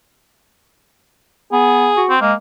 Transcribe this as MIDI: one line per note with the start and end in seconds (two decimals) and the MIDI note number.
1.52 1.90 59
1.52 2.04 68
1.97 2.14 66
2.10 2.19 60
2.21 2.34 56
2.21 2.33 58